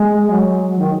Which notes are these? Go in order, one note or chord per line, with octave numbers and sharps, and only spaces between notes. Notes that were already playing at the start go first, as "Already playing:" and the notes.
Already playing: G#3
F#3
D#3